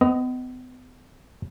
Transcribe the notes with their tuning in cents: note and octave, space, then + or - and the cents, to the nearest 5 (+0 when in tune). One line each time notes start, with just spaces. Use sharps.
B3 +40 D#5 +0